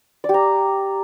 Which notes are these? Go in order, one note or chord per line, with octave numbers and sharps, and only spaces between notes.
D5
G4
A#5